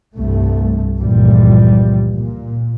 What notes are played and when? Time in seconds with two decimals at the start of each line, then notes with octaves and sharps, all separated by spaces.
0.16 C2 G2 A3
0.98 C#2 G2 A#2 E3 F3 G3
2.11 A#2